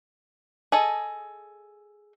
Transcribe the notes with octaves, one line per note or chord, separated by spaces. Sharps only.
G#4 A4 D#5